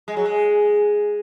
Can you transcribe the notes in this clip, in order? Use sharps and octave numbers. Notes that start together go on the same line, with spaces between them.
G#3
F#3
G#3